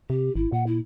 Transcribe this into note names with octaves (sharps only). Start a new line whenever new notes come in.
C3 G4
G#1 E4
A#2 F#5
E4